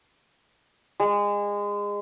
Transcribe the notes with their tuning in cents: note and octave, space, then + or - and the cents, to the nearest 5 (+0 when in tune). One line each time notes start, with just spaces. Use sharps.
G#3 -25